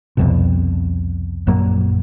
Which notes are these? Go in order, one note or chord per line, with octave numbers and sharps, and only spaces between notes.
C2 F2 B2
A#1 F#2 F#3 A#3